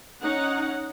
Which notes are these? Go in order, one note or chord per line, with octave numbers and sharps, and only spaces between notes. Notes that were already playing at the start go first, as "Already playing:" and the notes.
C#4 D#4 F#5